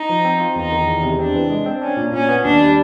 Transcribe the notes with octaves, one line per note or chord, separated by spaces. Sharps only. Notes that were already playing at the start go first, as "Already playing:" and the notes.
Already playing: D#4
F3
C4
F4
E2 D#4
D#3
E2
C3
C4 D4
E3
G#3
C4
C#4 D4
A#2
A#2 C#4
B3
D#2 D4
G3